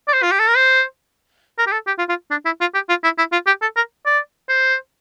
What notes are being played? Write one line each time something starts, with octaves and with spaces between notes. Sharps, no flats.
D5
C5
F4
G4
A4
A#4
C5
A#4
G4
A4
G4
F4
F4
D4
E4
F4
G4
F4
E4
E4
F4
G4
A4
A#4
D5
C5